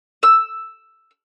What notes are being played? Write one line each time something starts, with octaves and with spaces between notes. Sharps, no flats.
E6